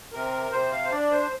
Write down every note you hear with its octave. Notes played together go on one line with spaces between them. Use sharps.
C3 A#4
C3 C5
F5
C5
D4 D5
C5